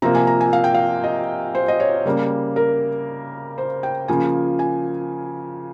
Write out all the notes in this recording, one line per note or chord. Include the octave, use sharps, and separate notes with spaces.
C3 F3 A#3 A#5
G#5
A#5
G#5
F5
G5
F5
D#5
C5
D#5
C#5
C#3 G3 A#3
A#4
C5
G5
C#3 F3 A#3 G#5
G#5